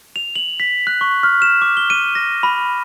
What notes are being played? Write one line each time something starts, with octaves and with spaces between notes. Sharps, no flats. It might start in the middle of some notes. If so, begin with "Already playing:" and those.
F7
F#7
B6
F#6
C#6
F6
E7
D6
G7
D#7
A#6
B5